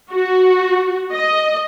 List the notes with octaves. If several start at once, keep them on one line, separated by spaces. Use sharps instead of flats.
F#4
D#5